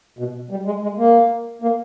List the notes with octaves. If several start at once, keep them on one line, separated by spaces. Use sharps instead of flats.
B2
G3
G#3
G#3
A#3
A#3